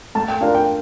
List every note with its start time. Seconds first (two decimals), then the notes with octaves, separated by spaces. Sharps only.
0.15 A3 A5
0.28 G5
0.41 D4 F4 A#4 F5
0.54 G5